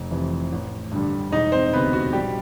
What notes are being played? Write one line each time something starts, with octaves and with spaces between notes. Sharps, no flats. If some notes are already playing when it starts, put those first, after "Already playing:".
Already playing: F1
F2 C3 E3
A1
G2 D3 G3
E1 D#4 D#5
C4 C5
D2 C3 B3 B4
F#4
A#1 G3 G4